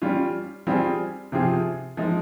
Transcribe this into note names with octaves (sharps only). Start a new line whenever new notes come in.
G3 C#4 F4
G3 C4 F4 G#4
C3 F3 C4 F4 G#4
F3 G#3 D#4